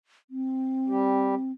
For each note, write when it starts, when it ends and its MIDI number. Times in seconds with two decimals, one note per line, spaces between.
0.30 1.52 60
0.88 1.35 55
0.88 1.35 67